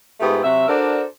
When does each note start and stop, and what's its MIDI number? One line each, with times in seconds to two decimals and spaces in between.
0.20 0.43 44
0.20 0.43 57
0.20 0.43 59
0.20 0.43 65
0.20 0.43 67
0.43 0.66 48
0.43 0.66 54
0.43 0.66 66
0.43 0.66 76
0.68 1.03 62
0.68 1.03 66
0.68 1.03 69
0.68 1.03 70
0.68 1.03 72
0.68 1.03 74